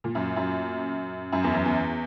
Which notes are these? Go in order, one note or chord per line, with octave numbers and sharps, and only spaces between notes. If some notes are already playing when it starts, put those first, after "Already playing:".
A#2
F#2
F#2
F#2
E2
F#2
E2